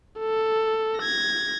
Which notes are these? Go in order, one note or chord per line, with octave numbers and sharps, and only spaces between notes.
A4
G#6 A#6